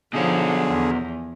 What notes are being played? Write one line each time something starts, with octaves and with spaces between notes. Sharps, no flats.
B2 D3 F3 G#4 C#5
E2